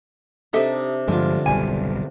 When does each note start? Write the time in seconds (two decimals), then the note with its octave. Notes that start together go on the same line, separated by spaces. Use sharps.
0.53 C3 D4 D#4 G4 A4 E5
1.08 G2 D3 F3 G#3 F4
1.46 F#1 B1 G3 G#5